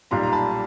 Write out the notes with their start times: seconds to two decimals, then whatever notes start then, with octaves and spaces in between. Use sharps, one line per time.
0.11 B1 A#2 G3 A#5 C6
0.23 A#5
0.32 A5 B5